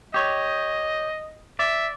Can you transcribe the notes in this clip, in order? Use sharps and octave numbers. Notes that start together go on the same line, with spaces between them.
G4 C#5 D#5
D5 E5